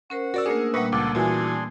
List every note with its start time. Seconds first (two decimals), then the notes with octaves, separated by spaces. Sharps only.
0.10 C#4 A#4 C5 F#5
0.34 F#4 A#4 D5 E6
0.46 A3 A#3 D4 G#4 A#4
0.74 A#2 G3 A#3 B4 E5 F#5 C#6 D#6
0.92 C#2 A4 F#5 D6
1.15 A#2 E3 D4 F#4 G#4 E5 G#5 C6